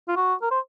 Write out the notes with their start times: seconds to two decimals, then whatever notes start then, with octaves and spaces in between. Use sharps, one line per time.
0.08 F4
0.16 F#4
0.42 A#4
0.51 C5